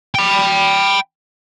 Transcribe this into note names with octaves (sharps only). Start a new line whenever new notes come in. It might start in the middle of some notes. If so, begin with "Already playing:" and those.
G5 B5